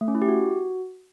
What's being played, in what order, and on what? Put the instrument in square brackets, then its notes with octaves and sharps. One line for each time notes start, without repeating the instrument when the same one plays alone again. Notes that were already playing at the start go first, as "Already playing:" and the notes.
[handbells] A3
C#4
E4
G4
F#4